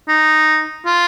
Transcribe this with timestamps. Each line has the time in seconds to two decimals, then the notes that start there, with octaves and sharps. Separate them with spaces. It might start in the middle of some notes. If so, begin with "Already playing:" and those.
0.08 D#4
0.86 F4